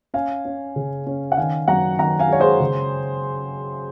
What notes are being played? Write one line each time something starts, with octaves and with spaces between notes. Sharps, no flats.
C#4 F5 G#5
C#4
C#3
C#4
F#5
D#3 F5 G#5
F#2 F#5 A#5
D#3 F#5 A#5
F5 G#5
G#3 C#5
G#4 C5
C#3